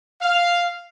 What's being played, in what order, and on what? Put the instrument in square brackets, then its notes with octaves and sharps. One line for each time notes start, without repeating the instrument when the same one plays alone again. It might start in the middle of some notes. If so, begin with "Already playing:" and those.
[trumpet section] F5